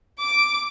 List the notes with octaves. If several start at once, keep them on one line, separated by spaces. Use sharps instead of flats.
D6